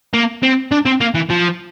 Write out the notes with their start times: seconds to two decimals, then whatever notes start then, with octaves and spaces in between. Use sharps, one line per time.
0.13 A#3
0.43 C4
0.71 D4
0.85 C4
1.00 A#3
1.14 E3
1.30 F3